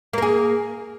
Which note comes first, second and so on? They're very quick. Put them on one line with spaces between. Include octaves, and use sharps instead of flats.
A#3 A#4 G#4